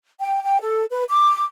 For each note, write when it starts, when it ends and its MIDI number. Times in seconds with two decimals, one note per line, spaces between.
0.20 0.43 79
0.43 0.59 79
0.61 0.84 69
0.91 1.03 71
1.09 1.42 86